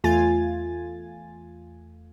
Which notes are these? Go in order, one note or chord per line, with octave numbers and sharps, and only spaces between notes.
E2 A3 F4 G#5 A6